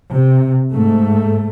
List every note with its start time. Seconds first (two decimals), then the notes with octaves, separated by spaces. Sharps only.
0.11 C3
0.73 G#2 A3